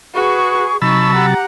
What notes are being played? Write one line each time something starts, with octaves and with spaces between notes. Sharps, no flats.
F#4 G#4 B4 C#6
C3 F#3 D#4 A5 B5 C#6 E6 A6
G4 F#5 A#5